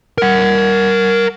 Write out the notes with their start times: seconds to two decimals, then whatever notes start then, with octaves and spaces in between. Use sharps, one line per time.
0.18 A#4 F#5